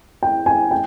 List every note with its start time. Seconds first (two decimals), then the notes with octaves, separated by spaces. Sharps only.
0.23 G5
0.46 G#5
0.71 G5